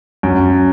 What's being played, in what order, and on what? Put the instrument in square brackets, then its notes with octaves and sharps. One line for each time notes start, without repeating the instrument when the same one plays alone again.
[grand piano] F#2